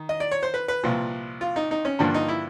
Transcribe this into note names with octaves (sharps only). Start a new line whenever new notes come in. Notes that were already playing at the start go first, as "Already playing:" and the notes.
Already playing: D#3
D#5
D5
C#5
C5
B4
B4
C2 A#2 F3
F4
D#4
D#4
C#4
G2 D3 F3 A#3 D4
D#4
E4